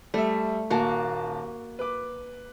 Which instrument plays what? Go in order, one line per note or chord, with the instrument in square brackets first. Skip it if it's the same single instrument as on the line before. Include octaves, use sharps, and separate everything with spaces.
[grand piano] G3 E5 [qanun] A3
[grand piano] D#1 A5 [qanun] A#3 F#4
[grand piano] B4 D6